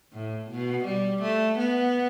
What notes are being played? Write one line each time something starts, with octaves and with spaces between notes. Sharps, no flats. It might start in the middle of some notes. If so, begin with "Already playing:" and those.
A2
B2
G3
A3
B3